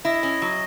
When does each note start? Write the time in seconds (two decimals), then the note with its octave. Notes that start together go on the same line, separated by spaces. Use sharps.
0.05 E4 D#5
0.23 C#4
0.42 F#3